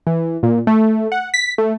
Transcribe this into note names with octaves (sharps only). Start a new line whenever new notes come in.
E3
A#2
A3
F#5
B6
A3